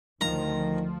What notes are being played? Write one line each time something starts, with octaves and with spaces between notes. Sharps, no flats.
D2 D#3 F3 A#5